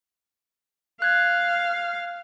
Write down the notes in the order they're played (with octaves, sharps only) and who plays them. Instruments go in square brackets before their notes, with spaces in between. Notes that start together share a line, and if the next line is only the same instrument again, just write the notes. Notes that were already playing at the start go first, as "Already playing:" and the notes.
[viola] F5 [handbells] F#6 G#6